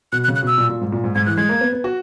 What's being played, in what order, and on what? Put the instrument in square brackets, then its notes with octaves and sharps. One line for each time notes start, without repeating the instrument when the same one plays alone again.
[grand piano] B2 [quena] F#6
[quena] F#6
[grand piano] C#3
[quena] F#6
[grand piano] B2 [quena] E6
[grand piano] A#2
A#2
G#2
A#2
G#2
[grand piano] G#2 [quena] G#6
[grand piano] E3 [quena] F#6
[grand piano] G#3 [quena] G#6
[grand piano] A#3
B3
B3
F#4